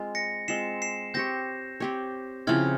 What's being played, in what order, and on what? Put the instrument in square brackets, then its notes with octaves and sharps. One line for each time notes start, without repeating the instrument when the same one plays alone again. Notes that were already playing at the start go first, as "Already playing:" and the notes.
Already playing: [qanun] G#3 C4 F4
[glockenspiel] A#6 C#7
[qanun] G#3 C4 F4 [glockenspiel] C7 E7
[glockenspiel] C7 E7
[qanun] C4 G4 C#5 [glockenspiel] G6 A#6
[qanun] C4 G4 C#5
[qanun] C#3 F3 C4 E4 [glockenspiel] F6 G#6